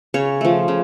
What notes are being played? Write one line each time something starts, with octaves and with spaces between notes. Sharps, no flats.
C#3 C#5
F3 A3
C#3